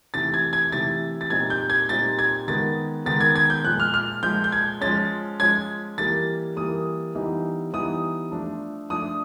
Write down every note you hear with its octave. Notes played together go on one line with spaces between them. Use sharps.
C3 E3 A3 A6
G#6
G#6
C3 E3 A3 A6
A6
A#2 G3 C4 D#4 G#6
G6
G#6
A#2 G3 C4 D#4 A6
G#6
D#3 G#3 B3 A6
D#3 G#3 B3 A6
G#6
G#6
G6
A#2 F3 G#3 F#6
F6
F6
A#2 F3 G#3 G6
G6
G#6
F3 G#3 C#4 A6
F3 G#3 C#4 G#6
E3 G3 A#3 A6
E3 G3 A#3 D#6
E3 G3 B3 D#4
E3 G3 B3 D#4 D#6
F3 A3 D4
F3 A3 D4 D#6